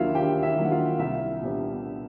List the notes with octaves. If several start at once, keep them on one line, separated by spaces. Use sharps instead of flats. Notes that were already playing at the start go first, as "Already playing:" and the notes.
Already playing: D#2 D#3 F#3 A#3 E4 F4 E5 F5
D#2 G4 G5
E4 E5
D#3 F#3 A#3
F#5
F4 F5
C2 E4 E5
A#2 G3 B3 D4